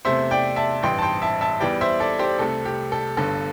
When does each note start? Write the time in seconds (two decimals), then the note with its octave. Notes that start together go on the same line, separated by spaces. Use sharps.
0.05 E2 C3 A3 C5 E5
0.31 D5 G5
0.56 E5 A5
0.83 A1 G2 E3 G5 C6
0.98 A5
1.02 G5 C6
1.22 E5 A5
1.41 E5 A5
1.61 E2 E3 G3 D5 G5
1.81 C5 E5
2.00 A4 D5
2.19 G4 C5
2.39 C2 C3 A3 A4
2.65 G4
2.92 A4
3.17 G1 G2 D3 A4